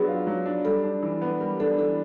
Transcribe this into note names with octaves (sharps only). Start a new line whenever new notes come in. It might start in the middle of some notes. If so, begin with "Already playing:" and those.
Already playing: F#3 B3 D4 G#4
F4
F#3
D4
G3 A4
D4
E3
B3
G3 A#4
D4 A4
E3 A4